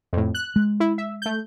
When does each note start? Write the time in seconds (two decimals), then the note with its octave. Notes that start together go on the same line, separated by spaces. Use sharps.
0.13 F2 A2
0.35 F#6
0.56 G#3
0.80 E4
0.98 E5
1.22 A3 G6